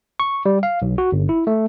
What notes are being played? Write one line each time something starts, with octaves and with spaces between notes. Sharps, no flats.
C#6
G3
F5
B1
F#4
G1
E4
A3